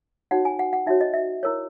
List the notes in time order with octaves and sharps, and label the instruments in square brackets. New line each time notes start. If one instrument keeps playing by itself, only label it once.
[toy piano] D#4 F#4 C#5 F#5
G#5
F#5
F#5
D#4 F#4 C#5 E5
D#5
E5
E4 A#4 C#5